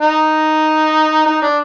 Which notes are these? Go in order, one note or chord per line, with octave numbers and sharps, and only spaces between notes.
D#4
D#4
D4